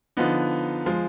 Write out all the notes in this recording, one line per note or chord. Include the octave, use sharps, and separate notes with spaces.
D3 F3 B3 D#4
F3 G#3